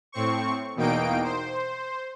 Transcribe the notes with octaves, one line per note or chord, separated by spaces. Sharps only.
A2 C4 C#6
E2 B2 A#3 D#4 G5 D7
C5